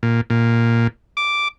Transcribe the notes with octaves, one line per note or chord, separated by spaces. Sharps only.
A#2
A#2
D6